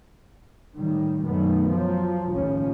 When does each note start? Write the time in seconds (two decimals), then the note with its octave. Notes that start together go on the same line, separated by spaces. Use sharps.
0.76 A2 D#3 G3
1.23 F#2 B2 D#3 A3 B3
1.70 F3 F#3
2.30 A1 D#2 C#3 F3 C#4